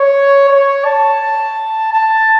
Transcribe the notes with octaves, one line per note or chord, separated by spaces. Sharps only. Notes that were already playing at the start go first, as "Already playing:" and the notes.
Already playing: C#5
C#5
A5
A5